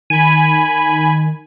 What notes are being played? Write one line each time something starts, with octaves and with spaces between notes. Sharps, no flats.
D#3 G#5 B5 D#7